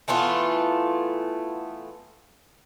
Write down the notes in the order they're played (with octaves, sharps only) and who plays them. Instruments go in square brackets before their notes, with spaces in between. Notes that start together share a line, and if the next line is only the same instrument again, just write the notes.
[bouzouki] E3 A3 B3 F4